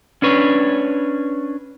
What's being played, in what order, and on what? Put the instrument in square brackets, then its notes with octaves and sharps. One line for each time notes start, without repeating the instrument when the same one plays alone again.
[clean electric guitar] C#4 D4 B4 C#5